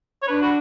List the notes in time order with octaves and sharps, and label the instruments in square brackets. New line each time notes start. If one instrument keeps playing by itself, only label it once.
[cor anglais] C#5
[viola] D4 [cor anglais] B4
[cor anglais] F#4